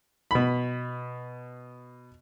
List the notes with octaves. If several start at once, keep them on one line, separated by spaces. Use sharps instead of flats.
B2 B5